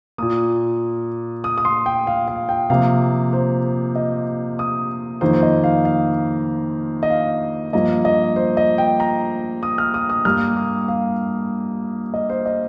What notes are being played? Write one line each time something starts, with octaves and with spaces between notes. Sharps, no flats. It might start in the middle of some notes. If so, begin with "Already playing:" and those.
A#2 A#3 D#6
D#6
D#6
C6
G5
F5
F5
G5
C3 F3 A#3 F5
C5
D#5
D#6
F2 D#3 A#3 C5
C5
D#5
F5
F5
D#5
F5
G2 F3 A#3 D#5
D#5
C5
D#5
G5
A#5
D#6
F6
D#6
D#6
G2 G3 A#3 F6
D#6
F5
D#5
C5
D#5